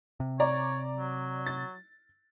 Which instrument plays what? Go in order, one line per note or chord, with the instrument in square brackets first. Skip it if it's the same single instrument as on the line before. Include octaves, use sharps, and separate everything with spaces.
[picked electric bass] C3
[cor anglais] C#5 [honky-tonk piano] D5 A#5
[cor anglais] F#3
[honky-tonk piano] A6